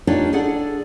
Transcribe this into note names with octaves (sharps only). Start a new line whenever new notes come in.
D4 D#4 F4 G4 C#5 D5
D4 G#4 A4 D5 F#5